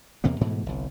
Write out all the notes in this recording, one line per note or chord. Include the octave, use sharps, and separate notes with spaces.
E2 C3 A#3 B3
G#2 B2 E3 A3
G1 C2